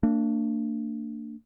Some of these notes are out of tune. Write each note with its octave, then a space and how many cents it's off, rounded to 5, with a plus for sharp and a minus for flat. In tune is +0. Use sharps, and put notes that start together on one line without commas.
A#3 -45 D4 +0